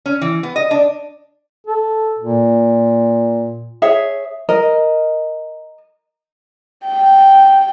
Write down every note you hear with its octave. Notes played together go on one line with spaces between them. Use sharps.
C#4
E3
B3
D#5
D4
A4
A#2
G#4 C#5 E5
A#4 D#5
G5